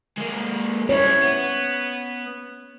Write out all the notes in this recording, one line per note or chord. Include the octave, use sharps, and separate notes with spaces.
G#3 A#3
G3 E4 C#5
B3